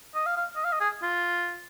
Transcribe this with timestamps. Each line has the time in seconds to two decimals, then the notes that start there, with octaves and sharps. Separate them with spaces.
0.15 D#5
0.26 F5
0.37 F5
0.56 D#5
0.64 F5
0.72 D#5
0.81 G#4
1.03 F4